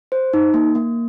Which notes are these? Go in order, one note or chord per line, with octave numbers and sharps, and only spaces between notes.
C5
D#4
A#3
A#3